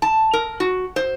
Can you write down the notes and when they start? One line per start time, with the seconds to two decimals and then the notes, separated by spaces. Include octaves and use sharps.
0.02 A5
0.33 A#4
0.60 F#4
0.96 C5